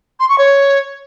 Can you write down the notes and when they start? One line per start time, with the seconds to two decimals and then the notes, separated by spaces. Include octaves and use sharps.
0.20 C6
0.29 C#6
0.38 C#5